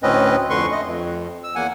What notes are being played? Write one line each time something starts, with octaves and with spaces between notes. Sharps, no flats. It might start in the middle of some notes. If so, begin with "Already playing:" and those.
D2 A2 C4 C#4 B4 D#5
F2 D3 B4 C6 C#6
A3 D#5
F2
E6
E2 A#3 F#5 G#5